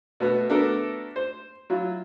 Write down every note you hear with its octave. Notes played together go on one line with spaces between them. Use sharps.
B2 A3 B3
A3 B3 D4 F#4 A4 A#4
C5
F#3 E4 F4